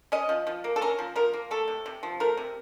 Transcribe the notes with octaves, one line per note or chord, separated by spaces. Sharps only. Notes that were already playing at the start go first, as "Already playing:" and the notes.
C#4 D#5
F3
F3
A#3
A4
C#4 A#4
F3
F3 A#4
A#3
A3 A4
C3
C3
F3
A3 A#4
C3